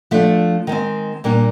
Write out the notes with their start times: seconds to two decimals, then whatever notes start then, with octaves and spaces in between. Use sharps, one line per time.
0.11 F3 A3 D4 E5
0.67 D#3 G#3 C4
1.24 A#2 G3 A#3 D4